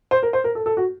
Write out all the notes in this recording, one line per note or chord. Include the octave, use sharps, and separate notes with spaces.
C5
A#4
C5
A#4
A4
A4
F#4